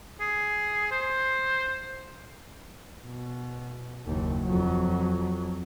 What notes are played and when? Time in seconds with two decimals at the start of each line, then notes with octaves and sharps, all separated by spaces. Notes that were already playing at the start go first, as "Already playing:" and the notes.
0.20 G#4
0.91 C5
3.06 B2
4.06 F#1 D#2
4.44 F2 F#3